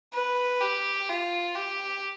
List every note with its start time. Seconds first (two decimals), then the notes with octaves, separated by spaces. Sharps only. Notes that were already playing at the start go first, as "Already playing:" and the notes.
0.13 B4
0.61 G4
1.09 F4
1.55 G4